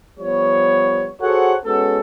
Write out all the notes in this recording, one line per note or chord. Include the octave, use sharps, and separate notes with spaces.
F3 G3 B3 C#5
F#4 G#4 A4 C5 C#5 F#5
G#3 B3 C#4 F#4 A4